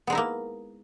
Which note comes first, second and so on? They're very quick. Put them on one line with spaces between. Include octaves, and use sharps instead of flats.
B3 G#3 D#4 E4 A#3